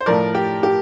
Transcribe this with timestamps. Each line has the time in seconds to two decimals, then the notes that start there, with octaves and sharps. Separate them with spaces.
0.01 C5
0.06 A2 F3 A3 A#4 D5
0.35 G4
0.63 G4